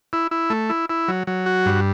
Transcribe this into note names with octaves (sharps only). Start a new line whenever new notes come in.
E4
E4
A3
E4
E4
F#3
F#3
F#4
G2